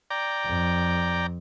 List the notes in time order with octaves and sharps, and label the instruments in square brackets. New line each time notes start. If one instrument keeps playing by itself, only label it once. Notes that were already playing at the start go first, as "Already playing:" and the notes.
[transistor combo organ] D5 G5 A#5
[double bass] F2